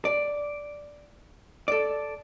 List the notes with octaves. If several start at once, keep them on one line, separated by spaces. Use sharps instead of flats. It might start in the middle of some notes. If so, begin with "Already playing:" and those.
D5
A4 D5